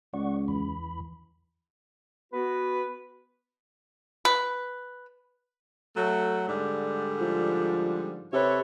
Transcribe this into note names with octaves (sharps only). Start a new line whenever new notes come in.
C#2 D5 F#5 C#6
E2 E3 B5
B3 F#4 B4
B4
F#3 A3
G#2 D3 G3
F3
C3 A4 B4 C#5